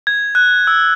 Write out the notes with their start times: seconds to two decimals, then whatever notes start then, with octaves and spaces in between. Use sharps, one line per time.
0.07 G#6
0.35 F#6
0.67 E6